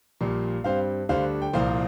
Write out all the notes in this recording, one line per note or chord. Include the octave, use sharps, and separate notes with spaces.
A#1 A#2 G3 A#3
G2 G3 C4 C5 F5
D2 D3 G3 D4 C5 F5
G5
C2 A#2 F3 A#3 C5 F5